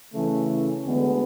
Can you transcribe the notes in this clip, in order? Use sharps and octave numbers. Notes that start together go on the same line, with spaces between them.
C#3 E3 A3 C#4
D2 D3 G#3 B3